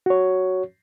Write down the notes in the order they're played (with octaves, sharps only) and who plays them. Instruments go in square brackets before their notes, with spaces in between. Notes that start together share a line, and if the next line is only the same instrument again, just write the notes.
[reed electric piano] F#4 C#5